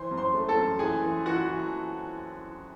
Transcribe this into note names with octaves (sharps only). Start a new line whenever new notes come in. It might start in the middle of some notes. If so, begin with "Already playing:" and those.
Already playing: E3 C5 C6
F#2
C5 C6
A3
A4 A5
F#2
E3 G#4 G#5
E3
E3 F#4 F#5
E3